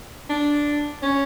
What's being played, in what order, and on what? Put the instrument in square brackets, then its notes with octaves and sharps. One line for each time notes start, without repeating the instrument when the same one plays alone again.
[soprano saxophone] D4
C#4